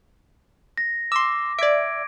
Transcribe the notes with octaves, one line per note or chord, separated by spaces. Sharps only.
A#6
C6 D6 E6
D5 E5 G#6 D7